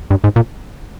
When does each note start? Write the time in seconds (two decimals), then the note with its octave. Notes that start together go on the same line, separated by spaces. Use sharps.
0.11 G2
0.24 G#2
0.36 A#2